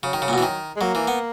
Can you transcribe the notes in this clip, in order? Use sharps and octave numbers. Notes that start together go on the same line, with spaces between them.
C#3 F#3
D#3
C#3
A#2
B2
E3
D#3
G#3
F#3 A#3
E3
B3